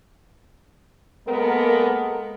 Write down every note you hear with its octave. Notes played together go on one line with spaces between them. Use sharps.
G#3 A#3 B3 A4 A#4